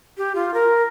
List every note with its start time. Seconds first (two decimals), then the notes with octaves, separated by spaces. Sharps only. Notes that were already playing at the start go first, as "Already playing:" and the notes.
0.18 G4
0.35 F4
0.54 A#4